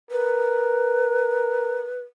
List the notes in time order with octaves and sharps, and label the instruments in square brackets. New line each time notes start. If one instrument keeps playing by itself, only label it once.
[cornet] A#4 [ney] B4